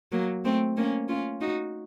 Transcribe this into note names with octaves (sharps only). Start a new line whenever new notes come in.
F#3 A#3
A3 C4
A#3 C#4
C#4 F4
D#4 F#4